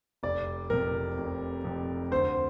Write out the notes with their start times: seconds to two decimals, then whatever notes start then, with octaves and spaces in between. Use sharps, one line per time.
0.23 F1 D5
0.70 F2 C3 A#4
1.18 F1
1.64 F2 C3
2.11 D2 C5